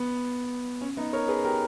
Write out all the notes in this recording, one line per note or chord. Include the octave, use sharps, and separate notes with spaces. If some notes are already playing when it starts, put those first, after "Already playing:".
Already playing: B3
C#4
B3 D#4
A#4 C#5
G#4 B4
G4 A#4